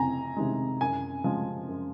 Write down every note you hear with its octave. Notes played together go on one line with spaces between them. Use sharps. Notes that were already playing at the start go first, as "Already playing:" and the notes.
Already playing: F2 C3 G#5 A#5
C3 D#3 G#3
F#2 G#5
F3 G#3
F#2